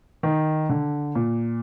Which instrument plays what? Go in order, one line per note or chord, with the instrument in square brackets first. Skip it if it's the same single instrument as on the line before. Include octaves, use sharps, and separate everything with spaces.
[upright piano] D#3
D3
A#2